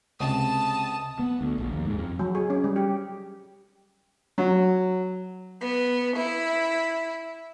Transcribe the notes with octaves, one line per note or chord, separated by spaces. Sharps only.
C#2 C3 A5 D#6
B3
D2
A#1
D#2
G#2
F2
F#3
G#4
C#4
G3
G4
F#3
B3
E4